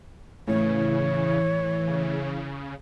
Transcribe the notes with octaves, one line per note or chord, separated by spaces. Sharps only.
A2 C#3 E3 C#5
C#3